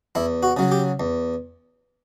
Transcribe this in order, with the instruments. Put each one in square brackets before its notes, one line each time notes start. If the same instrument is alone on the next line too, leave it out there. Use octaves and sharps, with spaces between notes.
[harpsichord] E2 E4
F#4
C#3 F#3
G4
E2